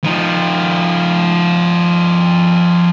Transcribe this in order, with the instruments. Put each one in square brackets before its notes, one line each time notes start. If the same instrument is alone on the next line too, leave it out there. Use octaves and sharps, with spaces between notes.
[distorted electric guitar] F3 D#4